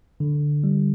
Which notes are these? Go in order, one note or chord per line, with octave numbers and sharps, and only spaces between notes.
D3
G3